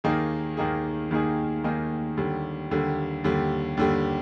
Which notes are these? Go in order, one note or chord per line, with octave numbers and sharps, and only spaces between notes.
D#2 D#3 A#3 D#4 G#4
D#2 D#3 A#3 D#4 G#4
D#2 D#3 A#3 D#4 G#4
D#2 D#3 A#3 D#4 G#4
D#2 D3 G3
D#2 D3 G3
D#2 D3 G3
D#2 D3 G3